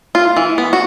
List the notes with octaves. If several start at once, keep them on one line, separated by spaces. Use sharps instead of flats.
F4
E3
B3
F#4